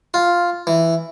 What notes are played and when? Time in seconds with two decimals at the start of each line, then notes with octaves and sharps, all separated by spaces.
0.14 F4
0.67 E3